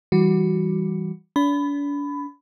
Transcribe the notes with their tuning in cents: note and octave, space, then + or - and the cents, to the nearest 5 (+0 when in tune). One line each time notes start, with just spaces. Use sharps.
E3 +0 G3 +0 F#4 +5
D4 -40 B5 +15